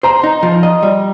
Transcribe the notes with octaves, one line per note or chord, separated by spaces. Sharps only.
C5 A#5
D#4
F3
D#5
G3